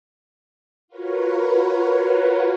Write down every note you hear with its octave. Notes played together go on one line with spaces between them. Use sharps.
F4 F#4 A#4 B4 C#5